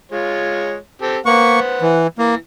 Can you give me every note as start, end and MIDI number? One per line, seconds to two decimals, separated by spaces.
0.12 0.76 56
0.12 0.76 65
0.12 0.76 73
1.02 1.18 60
1.02 1.18 67
1.02 1.18 69
1.26 1.60 58
1.26 2.01 71
1.26 2.01 72
1.26 2.01 78
1.26 1.60 85
1.82 2.07 52
2.19 2.36 52
2.19 2.35 58